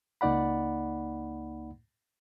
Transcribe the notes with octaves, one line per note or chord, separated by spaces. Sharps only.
C#2 A#3 D#4 D5 F#5 B5